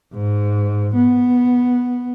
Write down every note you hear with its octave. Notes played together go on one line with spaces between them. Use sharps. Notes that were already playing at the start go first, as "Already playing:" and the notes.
G#2
B3